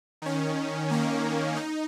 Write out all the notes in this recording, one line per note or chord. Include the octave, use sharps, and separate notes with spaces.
D#3 C#4
D#3 A#3 C#4
D#4